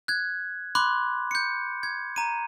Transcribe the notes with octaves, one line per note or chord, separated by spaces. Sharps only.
F#6 G#6
B5 C6 D6 F#6
G6 C#7
G#6
A#5 D#7